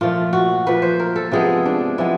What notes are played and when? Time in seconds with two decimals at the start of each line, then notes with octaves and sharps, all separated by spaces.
0.01 A#2 F3 A3 F4
0.33 F#4
0.66 A#2 F3 A3 B4
0.82 C5
1.00 A#4
1.16 A4
1.32 C3 F3 G#3 B3 G#4
1.66 D4
1.98 C3 F3 G#3 B3 E4